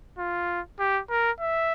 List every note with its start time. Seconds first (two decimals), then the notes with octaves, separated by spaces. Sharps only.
0.18 F4
0.79 G4
1.10 A#4
1.40 E5